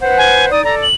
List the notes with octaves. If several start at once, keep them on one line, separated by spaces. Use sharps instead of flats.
B4 C5 F#5
G#5
D#4 D5 D#6
A4 D5 A#5
F#7